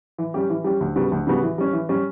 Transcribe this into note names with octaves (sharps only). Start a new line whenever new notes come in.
E3
G3 C#4 G4
E3
G3 C#4 G4
D2
C#3 G3 B3 F#4
D2
C#3 G3 B3 F#4
E3
G3 C#4
E3
G3 C#4